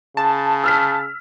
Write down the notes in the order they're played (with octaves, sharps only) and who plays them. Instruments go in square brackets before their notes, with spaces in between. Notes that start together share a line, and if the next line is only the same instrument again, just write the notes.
[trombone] C#3 [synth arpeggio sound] A5
[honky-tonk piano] E6 F6 B6